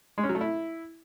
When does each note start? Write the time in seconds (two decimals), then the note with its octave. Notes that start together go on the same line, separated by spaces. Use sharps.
0.18 G#3
0.23 C#4
0.29 F#3
0.35 A3
0.41 E4